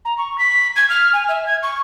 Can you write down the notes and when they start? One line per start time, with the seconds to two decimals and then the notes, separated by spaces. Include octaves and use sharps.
0.05 A#5
0.18 C#6
0.38 B6
0.76 G#6
0.89 F6
1.13 G#5
1.29 E5
1.46 G#6
1.63 C#6